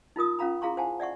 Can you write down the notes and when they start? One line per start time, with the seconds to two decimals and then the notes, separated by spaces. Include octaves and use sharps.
0.16 D#4 F4 A#4 D#6
0.39 C#4 F4 F5 A#5 B5
0.62 E4 G#4 F5 A#5 C6 C#6
0.77 C5 F5 F#5 G#5 A5
1.00 D5 E5 F#5 C#6